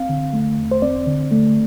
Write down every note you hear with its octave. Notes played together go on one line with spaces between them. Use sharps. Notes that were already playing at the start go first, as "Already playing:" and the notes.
Already playing: C4 F5
D3
A3
E2
C5
C4 D5
D3
A3